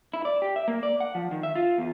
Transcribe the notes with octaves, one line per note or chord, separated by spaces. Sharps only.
E4
D5
G4
E5
A#3
D5
F#5
F3
D#3
E5
F4
E2